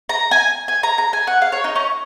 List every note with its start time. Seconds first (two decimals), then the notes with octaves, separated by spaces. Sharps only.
0.09 A#5
0.31 G#5
0.68 G#5
0.83 A#5
0.98 A#5
1.13 G#5
1.27 F#5
1.42 F5
1.52 C#5
1.64 D#4
1.76 C#4